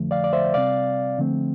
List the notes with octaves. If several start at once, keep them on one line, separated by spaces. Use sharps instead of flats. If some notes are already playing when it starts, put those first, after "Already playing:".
Already playing: F2 D3 F3 A3
D5 F5
D5
C5 E5
C3 G3 C4 D5 F5
D3 F3 A3 C4